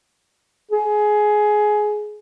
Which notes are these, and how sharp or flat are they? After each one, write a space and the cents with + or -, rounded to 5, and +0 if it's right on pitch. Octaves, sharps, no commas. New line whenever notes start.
G#4 +15